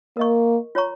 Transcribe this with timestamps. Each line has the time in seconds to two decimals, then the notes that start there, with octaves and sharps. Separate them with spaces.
0.17 A#3 A#4 D#5 C#6
0.75 F4 C#5 A#5 C#6